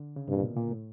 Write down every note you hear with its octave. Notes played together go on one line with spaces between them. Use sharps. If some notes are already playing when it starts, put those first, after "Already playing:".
Already playing: D3
C#3
G2 C3
A#2
B2
A#2
A2